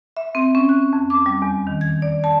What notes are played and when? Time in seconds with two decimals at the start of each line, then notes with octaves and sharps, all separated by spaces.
0.17 E5
0.35 C4
0.55 C#4
0.69 F#6
0.93 F2
1.10 D6
1.26 G3
1.42 E2
1.67 D#3
1.81 G#6
2.02 D5
2.24 A5